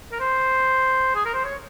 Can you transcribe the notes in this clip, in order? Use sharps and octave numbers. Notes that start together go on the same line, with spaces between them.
A#4
C5
G#4
A#4
C5
C#5